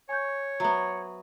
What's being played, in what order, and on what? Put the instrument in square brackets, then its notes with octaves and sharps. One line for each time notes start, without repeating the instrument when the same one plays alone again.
[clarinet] C#5 [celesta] G#5 C#6 G6
[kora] F#3 B3 [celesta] C5 E5 C#6